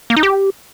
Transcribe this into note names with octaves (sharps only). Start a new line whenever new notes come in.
A#3
D#4
G4